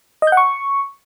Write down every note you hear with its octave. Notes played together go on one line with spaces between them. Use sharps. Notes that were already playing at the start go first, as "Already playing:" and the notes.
D#5
G6
F#5
C#6